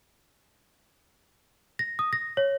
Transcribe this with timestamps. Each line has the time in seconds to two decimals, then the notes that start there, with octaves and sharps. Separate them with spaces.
1.79 A#6
1.99 D#6
2.13 A#6
2.37 C#5